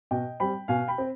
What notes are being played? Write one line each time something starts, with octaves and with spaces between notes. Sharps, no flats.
B2 D#5 G5
G3 C4 G5 B5
B2 F5 G#5
G5 B5
C4